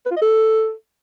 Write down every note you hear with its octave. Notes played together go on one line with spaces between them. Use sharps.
B4
F4
D#5
A4